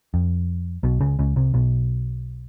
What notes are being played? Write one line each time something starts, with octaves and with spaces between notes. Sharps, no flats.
F2
B1 B2
C#2 C#3
C#2 C#3
C2 C3
B1 B2